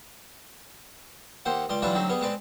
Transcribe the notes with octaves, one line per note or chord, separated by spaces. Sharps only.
D#2 G4 C5 F#5
C#2 G3 C6 D6
E3 F#3 G3 D4 F4 B4
D2 F#3 C4 D#4
G3 B3 G#4
G#3 C4 B4 D5